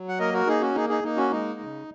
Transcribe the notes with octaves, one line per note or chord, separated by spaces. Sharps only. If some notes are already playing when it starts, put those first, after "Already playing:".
Already playing: F#3
F#5
A#3 A#4 D#5
F#4 A#4
A#3 D#4 G#4
C#4 F#4
A#3 D#4 G#4
D#4 G#4
A#3 D#4
C#4 F#4
G#3 D#4
C#3